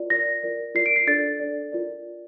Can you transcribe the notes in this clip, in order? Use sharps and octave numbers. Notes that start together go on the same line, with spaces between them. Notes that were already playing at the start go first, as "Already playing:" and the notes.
Already playing: F4 A#4 D5
F4 A#4 D5 A#6
F4 A#4 D5
F4 A#4 D5 C7
D7
C7
D4 A4 D5 A6
D4 A4 D5
F4 A#4 D5